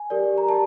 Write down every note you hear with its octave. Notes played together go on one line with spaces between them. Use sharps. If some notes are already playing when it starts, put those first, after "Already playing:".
Already playing: G#5
G4 A#4 D5
A#5
G4 A#4 D5 A5